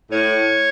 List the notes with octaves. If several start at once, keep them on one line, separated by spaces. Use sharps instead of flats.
A2 C#5